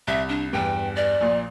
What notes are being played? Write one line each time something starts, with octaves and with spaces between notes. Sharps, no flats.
C2 E5
D4
E2 G2 G5
D5
A#1 A#2